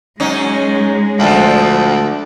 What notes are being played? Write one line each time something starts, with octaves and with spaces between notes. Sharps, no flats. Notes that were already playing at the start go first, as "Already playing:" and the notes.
F#2 G#3 C#4 D#4
D2 A#2 F3